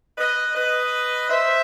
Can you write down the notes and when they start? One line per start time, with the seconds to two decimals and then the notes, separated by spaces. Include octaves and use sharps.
0.18 B4 D#5
0.55 B4 D#5
1.30 C5 E5